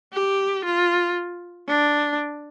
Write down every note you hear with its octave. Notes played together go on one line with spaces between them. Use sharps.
G4
F4
D4